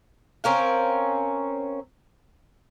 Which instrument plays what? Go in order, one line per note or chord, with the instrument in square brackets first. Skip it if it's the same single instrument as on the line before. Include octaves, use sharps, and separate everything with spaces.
[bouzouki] C4 C#4 A#4 F5